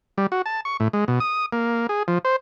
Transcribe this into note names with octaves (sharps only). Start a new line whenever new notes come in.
G3
F#4
A5
C#6
A2
G#3
B2
D#6
A#3
G#4
F3
C5